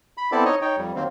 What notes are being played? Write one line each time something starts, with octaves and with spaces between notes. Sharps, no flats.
B5
B3 C4 E4 A4 D5
D#4 C#5 D#5
D#4 C#5 G5
F2 G3
D#3 F#3 A#3 C4